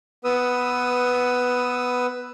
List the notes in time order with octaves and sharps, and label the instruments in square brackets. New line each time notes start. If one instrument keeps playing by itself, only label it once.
[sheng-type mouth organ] B3 B4 D#6 E6